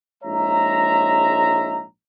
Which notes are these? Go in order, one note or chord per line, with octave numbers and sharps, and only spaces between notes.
A#1 G#2 G#3 C#5 E5 A#5